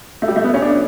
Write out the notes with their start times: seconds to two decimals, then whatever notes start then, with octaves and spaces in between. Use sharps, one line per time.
0.22 A3
0.28 G3
0.36 A3
0.44 B3
0.54 C#4
0.62 D4